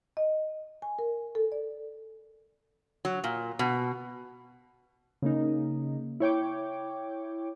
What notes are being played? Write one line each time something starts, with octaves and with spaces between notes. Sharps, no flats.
D#5
G#5
A#4
A4
D5
F#3
A#2
B2
C#3 A#3 D#4
E4 C#5 G5 D6